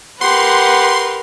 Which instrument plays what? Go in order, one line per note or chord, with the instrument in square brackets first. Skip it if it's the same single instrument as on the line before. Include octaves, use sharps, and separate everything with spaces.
[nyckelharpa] G4 F#5 [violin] A#4 B4 [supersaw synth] C6